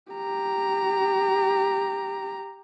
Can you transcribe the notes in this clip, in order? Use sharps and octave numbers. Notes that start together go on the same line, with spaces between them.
G4 A#5